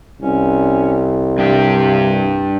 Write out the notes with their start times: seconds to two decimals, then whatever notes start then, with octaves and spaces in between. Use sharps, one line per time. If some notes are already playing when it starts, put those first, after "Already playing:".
0.22 C2 C#4
1.38 G2 C3 D4 G4